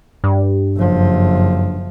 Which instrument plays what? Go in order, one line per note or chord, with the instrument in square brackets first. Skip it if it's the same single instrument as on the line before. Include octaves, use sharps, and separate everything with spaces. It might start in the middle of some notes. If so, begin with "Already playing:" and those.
[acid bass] G2
[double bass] F#1 F3